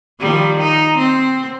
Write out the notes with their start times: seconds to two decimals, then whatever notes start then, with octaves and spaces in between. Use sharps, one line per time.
0.20 D#3 F3 G3
0.61 D#4
0.98 C4